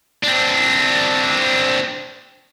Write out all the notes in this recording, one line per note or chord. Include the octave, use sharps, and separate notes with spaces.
C4 D4